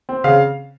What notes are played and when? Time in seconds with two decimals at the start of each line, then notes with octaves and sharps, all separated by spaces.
0.09 C4
0.24 C#3 F5